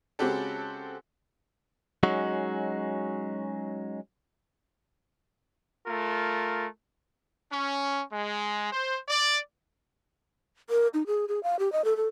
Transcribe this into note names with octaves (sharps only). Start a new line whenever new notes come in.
C#3 G#3 C4 F#4 G4 A4
F#3 G#3 C#4 D#4 F#4
A3 F4 A#4
C#4
G#3
C5
D5
A#4
D#4
G#4
G#4
F5
G4
D#5
A4
A4